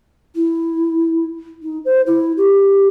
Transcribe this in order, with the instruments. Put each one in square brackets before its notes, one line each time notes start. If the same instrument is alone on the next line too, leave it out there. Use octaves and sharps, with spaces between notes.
[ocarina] E4
D#4
C5
E4
G4